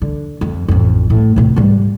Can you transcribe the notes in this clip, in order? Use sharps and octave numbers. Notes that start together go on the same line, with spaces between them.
D3
F2
A1 F2
A2
A2 C3
G#2 G3